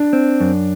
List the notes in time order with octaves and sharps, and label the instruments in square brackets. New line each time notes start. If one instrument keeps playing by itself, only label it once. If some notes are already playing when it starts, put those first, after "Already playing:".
Already playing: [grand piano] D4
[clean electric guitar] C4
F#2